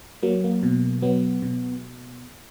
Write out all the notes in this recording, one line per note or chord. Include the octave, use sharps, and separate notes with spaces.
F#3 A#3
A#3
B2
F#3 B3
B2